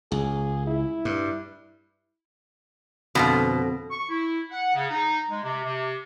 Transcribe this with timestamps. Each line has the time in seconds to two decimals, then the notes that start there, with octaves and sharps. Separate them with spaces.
0.12 C#2 G#4
0.67 E4
1.05 G2
3.15 F2 B2 D3 F4
3.91 C#6
4.09 E4
4.51 F#5
4.74 C#3
4.90 D#4
5.30 G#3
5.44 C3
5.64 C3